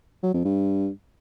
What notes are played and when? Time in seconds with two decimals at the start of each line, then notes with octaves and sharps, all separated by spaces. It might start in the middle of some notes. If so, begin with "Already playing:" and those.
0.23 F#3
0.34 F2
0.44 G2